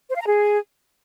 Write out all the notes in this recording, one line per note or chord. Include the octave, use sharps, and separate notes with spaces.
C5
F5
A#5
G#4